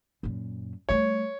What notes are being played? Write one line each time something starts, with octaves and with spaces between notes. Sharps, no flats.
F#2 A#2
G3 A3 C#5